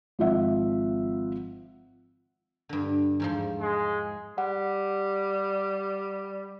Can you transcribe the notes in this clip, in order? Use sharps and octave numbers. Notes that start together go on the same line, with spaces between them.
G#1 F3 E5 F#5
G2 D3
E2 G#2 F3
G#3
G3 F#5